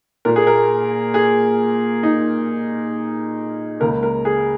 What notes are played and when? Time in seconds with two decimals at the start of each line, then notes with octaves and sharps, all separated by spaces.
0.25 A#2 A#3 A#4
0.36 G#4
0.47 A#4
1.14 G#4
2.03 D#4
3.80 C#2 C#3 A#3 A#4
4.03 A#4
4.25 G#4